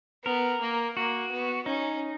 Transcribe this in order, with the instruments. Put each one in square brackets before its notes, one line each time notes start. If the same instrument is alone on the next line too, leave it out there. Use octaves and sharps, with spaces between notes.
[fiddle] B3 [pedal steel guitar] A#4
[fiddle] A#3
[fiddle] A#3 [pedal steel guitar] F#4
[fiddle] B3
[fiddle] C#4 [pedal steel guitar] D#4